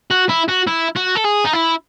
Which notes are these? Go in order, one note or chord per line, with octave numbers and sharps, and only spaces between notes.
F#4
E4
F#4
E4
F#4
A4
G#4
D#4
E4